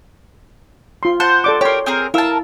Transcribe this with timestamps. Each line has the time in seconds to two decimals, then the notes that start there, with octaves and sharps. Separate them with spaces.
1.03 F4 C6
1.20 C5 F#5 A5
1.44 A4 D5 D6
1.61 G4 A#4 C#5 C6
1.86 C4 G#4 A#4
2.14 E4 A#4 F5 A5 E6